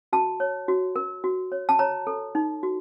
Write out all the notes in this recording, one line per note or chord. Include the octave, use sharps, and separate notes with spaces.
F#4 A5
C#5
F#4
A#4
F#4
C#5
A5
C#5 A#5
A4
D#4
F#4